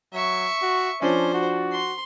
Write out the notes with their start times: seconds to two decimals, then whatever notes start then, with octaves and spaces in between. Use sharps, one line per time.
0.13 F#3 E5 C#6
0.62 F#4
1.02 F3 C#4 D4 C5
1.34 F#4
1.72 C6